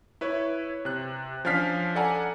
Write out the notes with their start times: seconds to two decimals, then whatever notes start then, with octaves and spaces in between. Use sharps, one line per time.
0.21 E4 B4 C#5
0.85 C3 F#6
1.45 F3 C#4 D4 F5 F6 B6
1.95 A4 D5 F#5 G#5 A#5